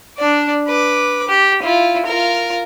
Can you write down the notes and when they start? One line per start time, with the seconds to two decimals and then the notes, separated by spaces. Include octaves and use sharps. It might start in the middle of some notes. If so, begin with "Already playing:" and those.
0.18 D4 D5
0.68 B4 D6
1.29 G4
1.63 E4 F4
2.06 F4 A#4